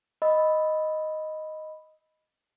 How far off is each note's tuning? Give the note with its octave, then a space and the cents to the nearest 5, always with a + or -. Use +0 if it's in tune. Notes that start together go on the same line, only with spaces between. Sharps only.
D#5 +0 B5 +0 E6 -15